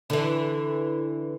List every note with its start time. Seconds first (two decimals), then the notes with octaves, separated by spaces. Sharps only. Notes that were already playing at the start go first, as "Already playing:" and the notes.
0.10 D3 E3